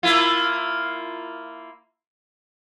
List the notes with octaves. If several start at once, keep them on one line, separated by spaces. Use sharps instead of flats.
A#3 E4 F4